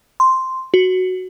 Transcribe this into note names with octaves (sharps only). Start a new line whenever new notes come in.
C6
F#4